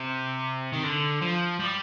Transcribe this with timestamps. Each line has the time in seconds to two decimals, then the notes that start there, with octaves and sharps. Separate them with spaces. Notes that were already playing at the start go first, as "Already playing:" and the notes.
Already playing: C3
0.72 D#3
0.83 D3
1.21 F3
1.60 G3